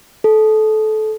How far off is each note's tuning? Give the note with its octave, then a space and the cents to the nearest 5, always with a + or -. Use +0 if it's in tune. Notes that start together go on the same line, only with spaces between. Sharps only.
A4 -20